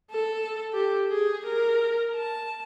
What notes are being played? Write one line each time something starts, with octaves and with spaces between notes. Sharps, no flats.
A4
G4
G#4
A#4
A5